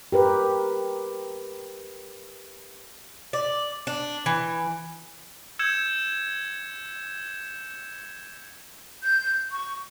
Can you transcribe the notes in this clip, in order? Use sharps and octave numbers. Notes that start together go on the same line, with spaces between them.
G4 A#4 B4
D5
D4
E3
E6 G6 G#6 C#7 E7
G6
C#6